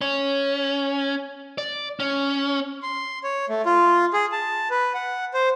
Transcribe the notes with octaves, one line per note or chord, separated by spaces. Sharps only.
C#4
D5
C#4
C6
C#5
A3
F4
G#4
A5
B4
F#5
C5